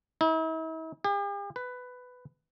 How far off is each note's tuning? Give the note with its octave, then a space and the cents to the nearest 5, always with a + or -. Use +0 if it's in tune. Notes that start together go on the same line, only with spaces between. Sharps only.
E4 -45
G4 +45
B4 +10